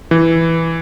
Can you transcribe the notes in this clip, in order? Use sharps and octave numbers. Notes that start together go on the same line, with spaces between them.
E3